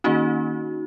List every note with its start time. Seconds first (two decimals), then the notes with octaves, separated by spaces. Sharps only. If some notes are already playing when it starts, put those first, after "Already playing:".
0.04 D#3 A#3 C#4 D#4 F#4